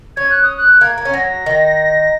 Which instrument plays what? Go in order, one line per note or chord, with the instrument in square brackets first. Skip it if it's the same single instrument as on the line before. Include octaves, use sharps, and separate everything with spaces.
[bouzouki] C#4 [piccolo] G#6
[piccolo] F#6
D#6
F#6
[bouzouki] A#3 [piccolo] G#6
[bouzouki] A#3
C#4
[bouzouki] F#3 [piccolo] A#6
[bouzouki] D#3